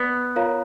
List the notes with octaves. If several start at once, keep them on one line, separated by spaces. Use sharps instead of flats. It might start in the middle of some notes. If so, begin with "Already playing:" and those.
Already playing: B3 B4 D5
F4 A#4 C#5 F5 A#5